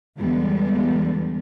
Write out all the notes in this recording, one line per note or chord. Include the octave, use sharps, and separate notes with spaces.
E2 D3 G3 G#3 B3